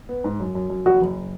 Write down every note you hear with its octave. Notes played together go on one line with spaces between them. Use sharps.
B3
G#2
F#2
F#2
F#2
F#1 F#4
F#1